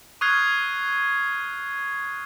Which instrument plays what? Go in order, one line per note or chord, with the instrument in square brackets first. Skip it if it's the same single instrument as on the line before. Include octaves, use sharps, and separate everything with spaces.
[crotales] C#6 D#6 F6 F#6 G#6 C7